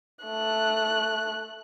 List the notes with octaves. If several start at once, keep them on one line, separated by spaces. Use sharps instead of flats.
A3 F#6